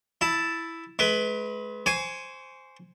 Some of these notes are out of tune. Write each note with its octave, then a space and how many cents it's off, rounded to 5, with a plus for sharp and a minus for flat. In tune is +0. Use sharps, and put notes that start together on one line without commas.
E4 +0 A5 +0
G#3 +40 B4 +10
C5 +0 G#5 +0 C#6 +35